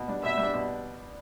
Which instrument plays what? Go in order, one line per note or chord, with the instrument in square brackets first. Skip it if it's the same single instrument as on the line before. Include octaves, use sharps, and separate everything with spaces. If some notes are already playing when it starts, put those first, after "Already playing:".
Already playing: [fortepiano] B2
G3 D4
[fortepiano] B2 [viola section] E5
[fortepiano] G3
D4
B2